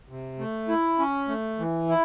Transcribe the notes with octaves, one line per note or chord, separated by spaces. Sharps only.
C3
A3
E4
C#4
A3
E3
E4